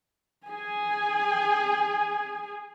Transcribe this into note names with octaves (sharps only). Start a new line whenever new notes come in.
G#4 G#5